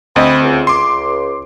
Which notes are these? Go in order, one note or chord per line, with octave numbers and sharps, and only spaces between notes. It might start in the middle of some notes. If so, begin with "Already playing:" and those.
D2 C4 D#5 B5 D#6
C#2
C6 D6